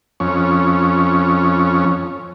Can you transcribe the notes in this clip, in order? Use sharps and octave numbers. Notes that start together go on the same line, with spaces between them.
F2 C#4